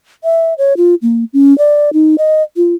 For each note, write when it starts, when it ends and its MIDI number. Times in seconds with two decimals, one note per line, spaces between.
0.24 0.54 76
0.58 0.76 73
0.77 0.95 65
1.02 1.24 58
1.33 1.56 61
1.58 1.90 74
1.93 2.16 63
2.18 2.43 75
2.57 2.75 65